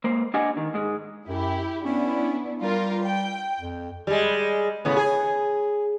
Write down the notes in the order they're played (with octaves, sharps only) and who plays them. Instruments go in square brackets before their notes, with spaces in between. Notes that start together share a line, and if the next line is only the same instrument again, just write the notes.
[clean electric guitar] G#3 A#3 C5
D4 G4 D#5 F#5 G#5
D#3
G#2 G#3
[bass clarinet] F#2 [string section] E4 G4
[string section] B3 D4 E4 [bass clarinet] C#4
[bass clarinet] G3 [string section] F4 A#4
[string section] G5
[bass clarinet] F2
[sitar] G3 G#3
A2 C#3 B3
G#4